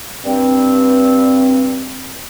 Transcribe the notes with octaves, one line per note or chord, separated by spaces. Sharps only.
G2 C4